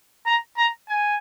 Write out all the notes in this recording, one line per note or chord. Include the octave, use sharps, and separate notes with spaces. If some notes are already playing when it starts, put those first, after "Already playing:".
A#5
A#5
G#5